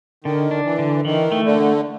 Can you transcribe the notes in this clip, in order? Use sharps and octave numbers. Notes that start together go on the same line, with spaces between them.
D3 D#3
D4
E3
D3
D#3 E3
A3
D3